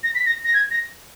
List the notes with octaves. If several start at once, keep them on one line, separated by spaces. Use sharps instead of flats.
A#6
B6
A#6
A#6
G#6
A#6